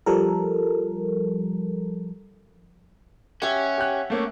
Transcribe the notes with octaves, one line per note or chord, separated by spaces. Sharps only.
F3 G3 A4 A#4
C#4 G4 E5 F#5
G4 F#6
A3 A#3 C#4